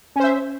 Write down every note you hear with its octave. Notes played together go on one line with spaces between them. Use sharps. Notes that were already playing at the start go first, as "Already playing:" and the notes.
C#4 C5 E5